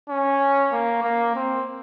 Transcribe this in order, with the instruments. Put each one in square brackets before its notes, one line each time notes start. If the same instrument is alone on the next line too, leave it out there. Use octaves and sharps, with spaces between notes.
[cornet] C#4
A#3
A#3
C4